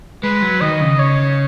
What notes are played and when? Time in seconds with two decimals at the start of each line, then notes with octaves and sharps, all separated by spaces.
0.23 G#3 B4
0.42 F#3
0.61 D#3 D#5
0.81 C#3
0.99 C#5